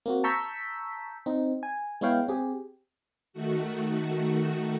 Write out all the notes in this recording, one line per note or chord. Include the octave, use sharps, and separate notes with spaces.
A#3 C4 F#4
A5 A#5 C#6 E6 G6 B6
C4 D#4
G#5
G#3 B3 E4 C#5 F5 G5
C4 G4 G#4
D#3 A3 F#4